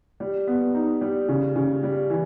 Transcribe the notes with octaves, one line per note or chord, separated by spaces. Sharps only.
G3
B3
D#4
G3
C#3
C#3
G3
E3